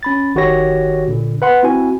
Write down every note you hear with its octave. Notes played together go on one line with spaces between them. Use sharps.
C#4 B5 A6
G1 D#3 F#4 G4 C#5 A#6
A#2 D3
B4 F#5 C6
C4 E4 F#4 G#5